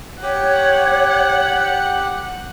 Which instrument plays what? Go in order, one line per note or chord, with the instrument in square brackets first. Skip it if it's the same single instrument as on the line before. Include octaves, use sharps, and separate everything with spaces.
[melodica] G4 [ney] C#5 [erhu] F#5